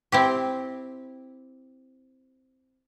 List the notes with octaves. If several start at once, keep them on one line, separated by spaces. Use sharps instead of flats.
C4 E4 G4